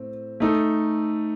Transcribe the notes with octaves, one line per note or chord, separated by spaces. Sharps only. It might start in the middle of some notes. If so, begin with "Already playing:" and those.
Already playing: A2 C4
A3 D#4 A4